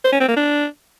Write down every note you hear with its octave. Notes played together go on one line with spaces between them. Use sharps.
C5
C#4
C4
A#3
D4